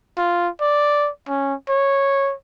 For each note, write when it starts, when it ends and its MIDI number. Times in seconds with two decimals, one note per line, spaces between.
0.18 0.48 65
0.61 1.09 74
1.28 1.54 61
1.69 2.34 73